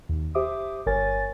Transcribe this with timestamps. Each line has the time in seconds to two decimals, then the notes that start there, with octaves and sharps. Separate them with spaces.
0.09 D#2
0.35 G4 C5 E5 D6 D#6
0.86 G1 A#4 C#5 G#5 A6